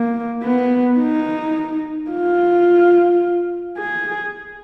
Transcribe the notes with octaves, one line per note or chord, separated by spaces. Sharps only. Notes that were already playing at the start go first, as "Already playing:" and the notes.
Already playing: A#3
B3
D#4
F4
G#4